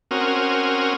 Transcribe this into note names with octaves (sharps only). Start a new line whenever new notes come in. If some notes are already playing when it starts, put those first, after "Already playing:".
C4 C#4 F#4 A#4 D#6 F6